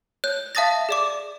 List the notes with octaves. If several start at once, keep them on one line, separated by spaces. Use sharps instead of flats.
C#5 F#6 G6
E5 F5 A5 D#6 A6 A#6
G#4 D5 D6